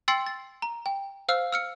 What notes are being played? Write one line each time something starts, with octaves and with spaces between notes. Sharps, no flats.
G5 C6 E6 A6 C7 C#7
A6
A#5
G5
C5 F5 E6 F6
E6 F6 C#7